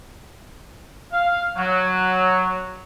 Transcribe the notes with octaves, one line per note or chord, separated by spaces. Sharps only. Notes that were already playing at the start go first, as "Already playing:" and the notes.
F5
F#3